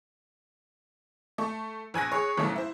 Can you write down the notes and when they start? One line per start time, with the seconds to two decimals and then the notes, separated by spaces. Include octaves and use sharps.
1.38 A3 C#6
1.94 A#1 G#5 F#6 A#6
2.12 G#4 C#5
2.37 B1 G#2 C#3 E3 A3
2.56 E4 C5